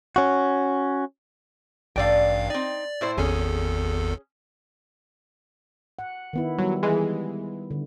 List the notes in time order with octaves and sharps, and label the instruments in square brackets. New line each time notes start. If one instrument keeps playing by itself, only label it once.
[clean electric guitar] C#4 F#4
[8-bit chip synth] A1 G2 F5 [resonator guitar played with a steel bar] A3 D5 G5
[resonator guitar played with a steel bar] C4 D#4 [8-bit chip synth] D5
[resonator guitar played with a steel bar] A2 E4 C5
[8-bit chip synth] G#1 E2 A4 [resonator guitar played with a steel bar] C#4 G#4
[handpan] F#5
D#3 B3 E4
[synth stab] F#3 [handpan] G3
[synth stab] E3 G#3
[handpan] D3